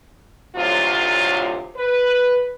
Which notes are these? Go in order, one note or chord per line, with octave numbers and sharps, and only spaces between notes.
D2 A2 C3 F#3 F4
B4